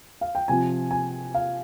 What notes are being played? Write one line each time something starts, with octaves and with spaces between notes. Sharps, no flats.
F5
G5
C3 F3 G#5
G#5
F5